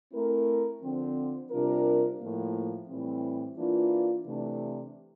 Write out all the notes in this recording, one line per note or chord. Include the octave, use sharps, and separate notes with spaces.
A3 C4 E4 A#4
D3 F3 C4
C3 G3 D4 F4 A#4
A2 F3 A#3
A2 E3 G3 C4
E3 A#3 D4 F4
C3 E3 A3 D4 A4